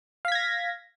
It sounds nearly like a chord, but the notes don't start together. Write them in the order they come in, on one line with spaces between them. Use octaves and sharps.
F5 B6 G#6 A#6